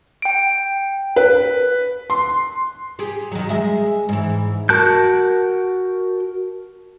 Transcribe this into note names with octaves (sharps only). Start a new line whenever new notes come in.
G5 D7
B4
C6
G4 G#4
D#3 F#3
G#3 E5
G#2 E3
F#4 A#4 A5 F#6 G6